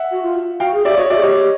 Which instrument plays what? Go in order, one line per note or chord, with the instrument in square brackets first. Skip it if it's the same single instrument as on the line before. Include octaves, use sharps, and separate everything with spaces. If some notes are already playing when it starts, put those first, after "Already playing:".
Already playing: [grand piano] E5 F#5
[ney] F#4
F4
[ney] F#4 [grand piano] F5 G5
[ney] G#4
[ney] G4 [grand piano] D5 E5
[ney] F#4 [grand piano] C#5 D#5
[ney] F#4 [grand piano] D5 E5
[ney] G#4
[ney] G4 [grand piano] C#5 D#5